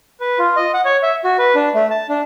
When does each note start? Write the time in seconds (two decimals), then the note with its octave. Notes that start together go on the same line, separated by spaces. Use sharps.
0.20 B4
0.39 F4
0.56 D#5
0.74 F#5
0.85 C#5
1.03 E5
1.24 F#4
1.39 B4
1.55 D4
1.74 A3
1.91 A5
2.09 D4